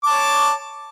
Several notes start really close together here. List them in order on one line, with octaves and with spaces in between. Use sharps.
D6 A5 C#5